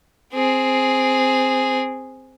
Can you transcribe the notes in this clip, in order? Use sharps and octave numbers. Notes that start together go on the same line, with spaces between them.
C4 G#4